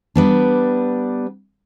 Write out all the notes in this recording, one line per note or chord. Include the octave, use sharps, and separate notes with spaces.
G3 B3 D4